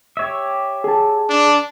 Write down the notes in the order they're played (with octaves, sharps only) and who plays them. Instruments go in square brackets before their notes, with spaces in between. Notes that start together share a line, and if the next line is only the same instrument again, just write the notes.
[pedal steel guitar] G4 C#5 E5
[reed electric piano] G#4 A5
[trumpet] D4